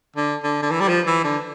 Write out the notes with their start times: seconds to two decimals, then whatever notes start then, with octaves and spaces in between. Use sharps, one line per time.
0.16 D3
0.43 D3
0.62 D3
0.71 E3
0.81 G3
0.88 F3
1.07 E3
1.24 D3